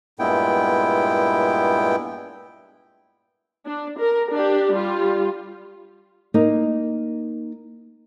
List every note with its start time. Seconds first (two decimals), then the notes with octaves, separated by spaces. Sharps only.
0.19 G2 A#2 G#3 B3 E4 G5
3.65 D4
3.99 A#4
4.32 D4 G4
4.74 G3 F4
6.34 A#3 D#4